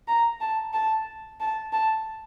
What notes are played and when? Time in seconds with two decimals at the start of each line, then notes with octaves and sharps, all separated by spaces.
0.08 A#5
0.41 A5
0.74 A5
1.40 A5
1.73 A5